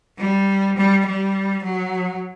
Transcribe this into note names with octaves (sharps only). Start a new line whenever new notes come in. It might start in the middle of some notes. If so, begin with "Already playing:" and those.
G3
G3
G3
F#3